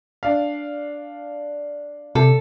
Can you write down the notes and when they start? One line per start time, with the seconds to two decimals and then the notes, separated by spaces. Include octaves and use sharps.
0.23 D4 F5
2.15 C3 A4